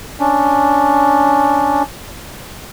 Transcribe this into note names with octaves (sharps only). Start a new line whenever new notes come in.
C#4 D4